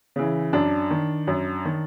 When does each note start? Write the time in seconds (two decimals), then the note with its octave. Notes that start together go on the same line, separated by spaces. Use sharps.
0.16 C#3 E3
0.53 F#2 D4
0.91 D#3
1.27 F#2
1.65 D#3